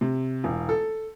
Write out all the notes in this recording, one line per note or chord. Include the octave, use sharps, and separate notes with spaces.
C3
E1
A4